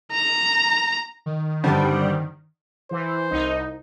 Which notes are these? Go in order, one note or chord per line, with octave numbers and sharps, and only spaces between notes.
A#5
D#3
G2 D3 D#3 G3 C4
E3 C5
C2 D#4